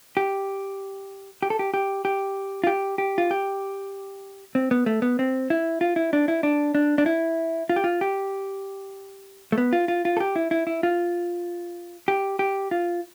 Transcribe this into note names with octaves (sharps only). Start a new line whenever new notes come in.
G4
G4
A4
G4
G4
G4
F4
G4
G4
F4
G4
C4
B3
A3
B3
C4
E4
F4
E4
D4
E4
D4
D4
D4
E4
F4
G4
F4
G4
A3
B3
F4
F4
F4
A4
G4
E4
E4
E4
F4
G4
G4
F4